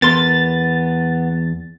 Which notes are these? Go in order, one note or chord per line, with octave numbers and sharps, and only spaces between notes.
E2 B3 A#4 C6 A6